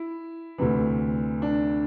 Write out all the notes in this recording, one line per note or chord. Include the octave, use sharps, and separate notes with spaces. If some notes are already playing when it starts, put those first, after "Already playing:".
Already playing: E4
D2 C3 E3
D4